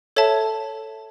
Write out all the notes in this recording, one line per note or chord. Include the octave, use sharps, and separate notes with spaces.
A4 C#5 E5 A5